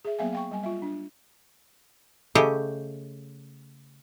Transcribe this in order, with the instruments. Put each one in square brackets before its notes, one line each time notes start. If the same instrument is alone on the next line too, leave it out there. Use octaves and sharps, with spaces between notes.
[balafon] G#4 E5
F#3 A#3 B3 E5 F5 G#5
F5 G5 C#6
G3 G#5
F4 E5
D4
[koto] C#3 A3 G4 D#5